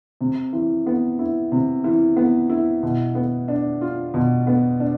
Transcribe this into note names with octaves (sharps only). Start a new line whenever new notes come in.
C3
E3
B3
E4
C3
E3
B3
E4
B2
B3
D4
F4
B2
B3
D4